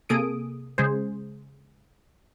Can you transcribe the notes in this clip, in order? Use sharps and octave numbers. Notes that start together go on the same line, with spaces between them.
C3 A#3 G#4 A4 D#6 D7
C#3 G#3 G#4 C5